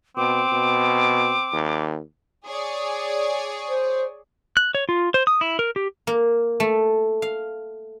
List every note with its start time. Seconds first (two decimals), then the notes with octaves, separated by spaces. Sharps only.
0.17 B2 C4 D6
0.53 B2
1.53 D#2
2.47 G#4 C#5 D5
3.68 C5
4.57 F#6
4.75 C#5
4.89 F4
5.14 C5
5.27 D#6
5.41 E4
5.59 A#4
5.76 G4
6.07 A#3
6.60 A3
7.22 F5